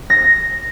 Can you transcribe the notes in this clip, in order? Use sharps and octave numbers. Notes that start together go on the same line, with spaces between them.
A#6